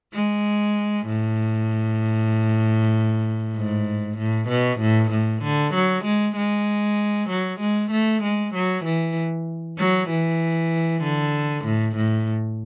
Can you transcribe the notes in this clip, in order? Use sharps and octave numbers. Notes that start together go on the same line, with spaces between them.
G#3
A2
G#2
A2
B2
A2
A2
D3
F#3
G#3
G#3
F#3
G#3
A3
G#3
F#3
E3
F#3
E3
D3
A2
A2